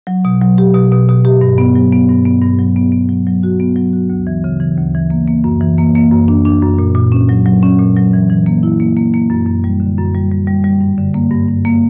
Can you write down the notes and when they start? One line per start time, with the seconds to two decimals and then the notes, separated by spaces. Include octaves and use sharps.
0.07 F#3
0.25 B2
0.41 F#3
0.58 G4
0.74 B2
0.92 B2
1.09 B2
1.25 G4
1.41 G2
1.58 B3
1.76 F#3
1.92 B3
2.09 G2
2.25 B3
2.42 G2
2.59 F#3
2.76 B3
2.92 B3
3.09 F#3
3.27 F#3
3.43 F#4
3.60 B3
3.76 F#3
3.93 F#4
4.10 D2
4.27 E3
4.44 C#3
4.60 E3
4.78 D2
4.95 E3
5.10 A#3
5.28 A#3
5.44 F#2
5.61 E3
5.78 A#3
5.95 A#3
6.12 F#2
6.28 D4
6.45 D4
6.62 F#2
6.79 A#2
6.95 A#2
7.12 C#4
7.29 F#3
7.46 F#3
7.63 C#4
7.79 A#2
7.96 F#3
8.13 E3
8.30 E3
8.46 A#3
8.63 E4
8.80 A#3
8.97 A#3
9.14 A#3
9.30 F#2
9.47 F#2
9.64 G3
9.80 D3
9.98 F#2
10.15 G3
10.32 G3
10.47 G3
10.64 G3
10.81 G2
10.98 D3
11.14 A#3
11.31 G2
11.48 G2
11.65 A#3